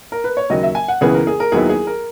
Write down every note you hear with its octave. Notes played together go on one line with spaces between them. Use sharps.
A#4
B4
C#5
D#2 C#3 F#3 D#5
E5
G#5
F#5
C#2 C#3 E3 B3 G#4
A#4
G#4
A#4
D#2 D#3 F#3 B3 E4 G#4
G#4
A#4